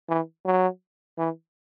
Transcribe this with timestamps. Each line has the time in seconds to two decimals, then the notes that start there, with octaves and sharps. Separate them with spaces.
0.09 E3
0.45 F#3
1.18 E3